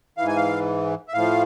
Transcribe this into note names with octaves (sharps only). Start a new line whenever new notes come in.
G#2 E3 F5
G#5
F5
E5
A2 F3 F5